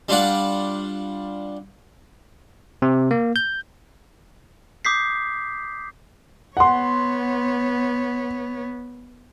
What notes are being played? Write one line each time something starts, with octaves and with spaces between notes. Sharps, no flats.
G3 D4 F4 D5 F#5
C3
A#3
G6
D6 D#6 G6 B6 C7
B3 C#5 F#5 C6